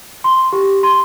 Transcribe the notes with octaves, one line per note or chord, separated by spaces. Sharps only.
C6
G4
C6